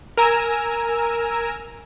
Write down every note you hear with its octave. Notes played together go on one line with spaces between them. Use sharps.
A#4 G#5 A#5 E6